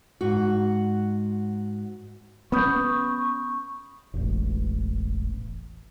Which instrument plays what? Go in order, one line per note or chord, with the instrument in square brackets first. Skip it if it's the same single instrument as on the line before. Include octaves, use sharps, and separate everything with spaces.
[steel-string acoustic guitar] G#2 F#4
[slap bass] B3 C#4 [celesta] B5 D#6 G6 [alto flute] C#6
[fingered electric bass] E1 A1